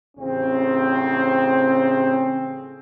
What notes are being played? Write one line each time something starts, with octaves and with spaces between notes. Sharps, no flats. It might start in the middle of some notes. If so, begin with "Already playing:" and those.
A1 C#3 C4